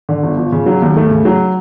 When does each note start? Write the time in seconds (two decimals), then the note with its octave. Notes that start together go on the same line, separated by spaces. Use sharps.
0.09 D3
0.23 G1
0.37 F3
0.52 C#3
0.66 F#3
0.82 D#2
0.96 A3
1.11 C#3
1.25 F#3